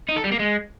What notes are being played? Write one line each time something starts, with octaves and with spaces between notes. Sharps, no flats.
D#4
A4
G3
A#3
G#3